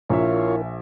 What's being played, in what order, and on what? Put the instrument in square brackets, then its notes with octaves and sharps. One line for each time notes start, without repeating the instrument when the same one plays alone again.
[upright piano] A#1 E5 [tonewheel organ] E4 A#4 [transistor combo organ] F4 C#5